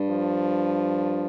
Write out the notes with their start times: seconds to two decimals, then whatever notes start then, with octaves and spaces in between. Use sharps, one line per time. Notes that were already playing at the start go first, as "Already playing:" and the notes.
Already playing: G2
0.10 F3